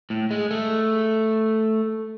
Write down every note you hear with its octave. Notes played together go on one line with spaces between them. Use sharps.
A2
G#3
A3